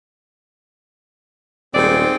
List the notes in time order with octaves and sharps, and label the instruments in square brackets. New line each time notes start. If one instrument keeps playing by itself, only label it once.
[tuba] D#1 [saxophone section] G#2 G#4 D5 [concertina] C4